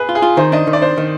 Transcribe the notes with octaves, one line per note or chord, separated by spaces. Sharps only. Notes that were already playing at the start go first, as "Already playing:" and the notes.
Already playing: G#4 B4
F4
G#4
F4
D#3 C5
D4 D#5
D#3
D5
D4 C5
D#3